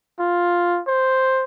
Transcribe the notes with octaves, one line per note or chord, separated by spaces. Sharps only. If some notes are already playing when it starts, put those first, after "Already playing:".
F4
C5